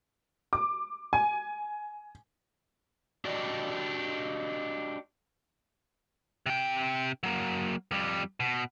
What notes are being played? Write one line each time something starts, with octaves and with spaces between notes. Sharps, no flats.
D6
G#5
D4 F#4 G4 D5 D#5
C3 G5
F#3 A#3
F2 G3
B2